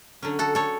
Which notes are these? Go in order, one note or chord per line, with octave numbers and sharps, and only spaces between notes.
D3 F#3 C#4
F#4 A4
A4 C#5